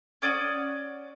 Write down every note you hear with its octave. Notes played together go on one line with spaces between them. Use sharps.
C#4 D5 F#5 D#6